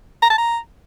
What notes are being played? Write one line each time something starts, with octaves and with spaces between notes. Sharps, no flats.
A#5
A5
A#5